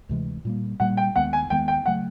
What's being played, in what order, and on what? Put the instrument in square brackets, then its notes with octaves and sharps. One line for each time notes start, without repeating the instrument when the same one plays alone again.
[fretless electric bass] D2 C3 E3 G#3
A#2 G3 A#3
[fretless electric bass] A#2 G3 A#3 [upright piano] F#5
[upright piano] G5
[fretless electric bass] D#2 D#3 G#3 B3 [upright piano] F#5
[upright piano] G#5
[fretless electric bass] D#2 D#3 G#3 B3 [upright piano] G5
[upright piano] G5
[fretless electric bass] C#3 F#3 A3 [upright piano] F#5